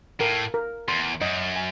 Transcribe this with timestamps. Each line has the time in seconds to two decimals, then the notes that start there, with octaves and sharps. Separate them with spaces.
0.20 A2 A#4
0.54 A#4
0.88 E2 C6
1.21 F#2 D#5
1.56 G#5